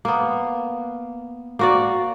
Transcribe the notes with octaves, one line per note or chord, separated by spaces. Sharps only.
A#3 B3
A#3 F#4 D5